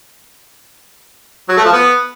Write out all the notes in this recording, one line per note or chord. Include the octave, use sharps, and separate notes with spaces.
F#3
A3
F3
B3